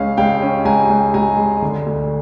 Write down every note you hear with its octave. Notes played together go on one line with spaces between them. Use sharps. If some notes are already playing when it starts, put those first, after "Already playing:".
Already playing: C#2 C#4 F5
C#2 F5 G5
C#4
C#2 G#5 A#5
C#2
C#2 G#5 A#5
G#3
D3
D2